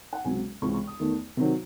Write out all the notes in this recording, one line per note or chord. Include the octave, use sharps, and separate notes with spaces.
F#5
C#2 C3 F#3 C#4 G#5
C#2 C3 E3 G#3 C#6
C#6
D#6
E2 D#3 A3
C3 D#3 F#3